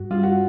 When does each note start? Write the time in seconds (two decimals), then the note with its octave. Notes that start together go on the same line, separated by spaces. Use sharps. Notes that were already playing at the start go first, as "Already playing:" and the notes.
Already playing: G2 F#4
0.11 G3 F4
0.23 F#4